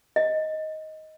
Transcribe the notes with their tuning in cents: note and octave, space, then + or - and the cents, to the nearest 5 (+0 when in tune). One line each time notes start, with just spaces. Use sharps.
D#5 +10